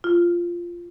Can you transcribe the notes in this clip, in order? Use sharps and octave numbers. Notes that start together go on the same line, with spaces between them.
F4